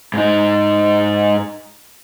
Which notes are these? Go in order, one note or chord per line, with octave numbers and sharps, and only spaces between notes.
G#2 D#4